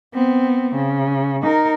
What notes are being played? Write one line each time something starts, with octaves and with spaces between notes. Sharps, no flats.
B3 C4
C#3
D#4 A#4